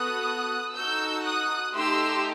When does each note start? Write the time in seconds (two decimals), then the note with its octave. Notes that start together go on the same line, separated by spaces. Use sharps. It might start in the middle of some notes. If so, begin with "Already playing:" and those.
Already playing: B3 F#4 A4 D#6 F#6
0.74 D#4 F#4 A4 E6 G6
1.24 D#6 F#6
1.74 A3 D#4 G4 C6 E6